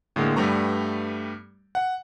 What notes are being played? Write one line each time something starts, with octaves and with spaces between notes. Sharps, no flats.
A2 D3 G#3 A#3
G2 G3 A3 B3 A#5 C#6
F#5